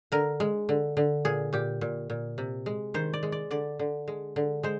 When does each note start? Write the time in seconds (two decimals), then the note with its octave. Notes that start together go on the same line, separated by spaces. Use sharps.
0.12 D3 A#4
0.40 G#3
0.69 D3
0.97 D3
1.25 A#2 G#4
1.53 A#2 G4
1.81 A#2
2.10 A#2
2.38 C3
2.66 G#3
2.94 D#3 C5
3.13 D5
3.23 G#3
3.32 D5
3.51 D3 D5
3.79 D3
4.08 G#3
4.36 D3
4.63 G#3 C5